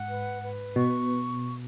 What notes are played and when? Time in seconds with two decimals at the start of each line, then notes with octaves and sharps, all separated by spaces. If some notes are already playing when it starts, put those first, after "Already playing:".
Already playing: G#2 F#5
0.08 B4
0.42 B4
0.76 B2 C#6